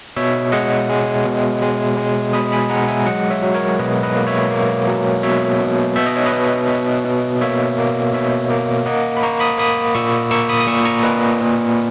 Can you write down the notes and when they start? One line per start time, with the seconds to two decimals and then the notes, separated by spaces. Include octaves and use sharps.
0.17 B2 C#5 E5
0.52 G#3 D#5 F#5
0.89 G#3
1.25 B2
1.62 G#3
1.97 G#3
2.33 B2 B5 D#6
2.52 G#5 B5
2.70 G#3 F#5 A#5
2.88 E5 G#5
3.06 F#3 D#5 F#5
3.30 C#5 E5
3.43 F#3
3.54 A#4 C#5
3.79 B2 B4 D#5
4.03 B4 D#5
4.16 A#3
4.27 C#5 E5
4.51 A#3
4.87 F#3
5.23 B2 C#5 E5
5.60 B2
5.96 B2 E5
6.06 D#5
6.16 C#5
6.26 B4 D#5
6.33 B2
6.68 B2
7.04 B2
7.41 A#3 C#5 E5
7.78 A#3
8.13 B2 C#5 E5
8.50 A#3
8.86 A#3 D#5 F#5
9.17 B5
9.23 A#3 A#5 C#6
9.40 B5 D#6
9.58 A#3 B5 D#6
9.95 A#2 C#6 E6
10.31 A#3 C#6 E6
10.49 B5 D#6
10.60 D#6
10.67 A#2 C#6 E6
10.85 A#5 C#6
11.03 A#2 B4 D#5
11.40 A#2